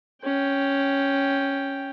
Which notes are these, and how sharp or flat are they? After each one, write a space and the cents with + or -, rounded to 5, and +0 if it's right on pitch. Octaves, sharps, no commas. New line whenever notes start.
C#4 +0 G5 +0